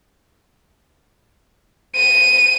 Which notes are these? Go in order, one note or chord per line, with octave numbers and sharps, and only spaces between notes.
D#7